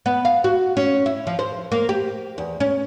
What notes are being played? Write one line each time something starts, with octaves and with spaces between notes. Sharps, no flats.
B3
F5
F#4
C#4
E4
F3
C5
A#3
G4
E2
C#4